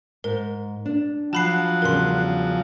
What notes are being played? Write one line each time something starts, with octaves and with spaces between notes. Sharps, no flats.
G#2 A#4
D4
F3 F#3 F#5 A5 B5 C7
E2 C#3 G3 A#4 C6